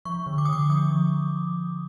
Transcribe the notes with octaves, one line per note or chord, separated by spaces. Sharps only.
F3 C#6
D3
D6
D#6
D3 D6
F3 D#6
F3